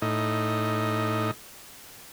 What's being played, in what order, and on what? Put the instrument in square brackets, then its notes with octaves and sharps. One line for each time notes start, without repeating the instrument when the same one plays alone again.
[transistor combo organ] A2 D#4